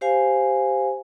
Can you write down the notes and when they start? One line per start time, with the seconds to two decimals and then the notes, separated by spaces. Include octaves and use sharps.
0.01 G4 C5 F5 G#5